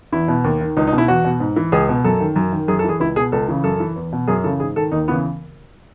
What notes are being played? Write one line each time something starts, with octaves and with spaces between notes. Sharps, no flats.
E2 E4
B2
D#2
D#3
C#2 D#4
D#4
B2
E4
E2 F#4
B2
G#2
E3
C#2 G#4
B2
F#2 A4
D#3
F#2
D#3
F#2 G#4
A4
E3 G#4
C#2 E4
B2 G#4
C#2 A4
C#3 E3
F#2 A4
E3
E2
B2
F#2 G#4
C#3 E3 A4
G#2 G#4
D#3 A4
D#2 D#4
C#3 E3 B3